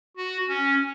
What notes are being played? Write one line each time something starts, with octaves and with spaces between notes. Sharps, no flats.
F#4
C#4